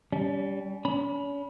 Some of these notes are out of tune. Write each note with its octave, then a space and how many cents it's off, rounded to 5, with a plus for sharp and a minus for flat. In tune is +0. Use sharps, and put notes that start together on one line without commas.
G3 +0 C#4 +40
C#4 +40 B5 -15